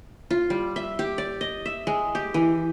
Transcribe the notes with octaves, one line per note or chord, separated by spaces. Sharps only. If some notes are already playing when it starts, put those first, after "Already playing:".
F4
G3
E5
G4
D5
D#5
E5
G#3
G4
E3